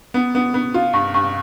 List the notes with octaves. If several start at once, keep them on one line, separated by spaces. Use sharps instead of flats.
B3
B3
B3
F4
G2
G2